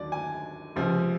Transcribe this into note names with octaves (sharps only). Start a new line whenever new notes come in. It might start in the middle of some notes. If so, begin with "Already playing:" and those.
Already playing: D#2 D3 F#3 D5
G#5
C#2 C3 F3